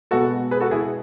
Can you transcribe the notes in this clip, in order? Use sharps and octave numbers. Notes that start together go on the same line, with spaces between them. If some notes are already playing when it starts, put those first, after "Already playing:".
B2 G#3 B3 F#4 A4
G#4 B4
F#4 A4
E4 G#4